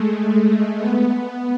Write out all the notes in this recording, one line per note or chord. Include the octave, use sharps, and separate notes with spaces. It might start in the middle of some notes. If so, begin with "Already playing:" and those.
Already playing: G#3 A3
A3
B3